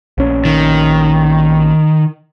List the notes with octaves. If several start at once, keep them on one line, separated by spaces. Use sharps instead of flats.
A#1 C#4
D#3